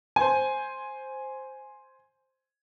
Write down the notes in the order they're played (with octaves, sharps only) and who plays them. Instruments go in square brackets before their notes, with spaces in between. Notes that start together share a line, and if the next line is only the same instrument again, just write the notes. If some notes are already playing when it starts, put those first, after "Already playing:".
[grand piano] C5 G#5